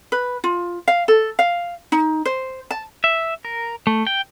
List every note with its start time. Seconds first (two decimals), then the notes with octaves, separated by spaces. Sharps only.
0.12 B4
0.44 F4
0.88 F5
1.08 A4
1.39 F5
1.92 D#4
2.25 C5
2.71 A5
3.04 E5
3.45 A#4
3.87 A3
4.07 G5